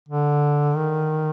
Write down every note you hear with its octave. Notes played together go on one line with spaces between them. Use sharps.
D3
D#3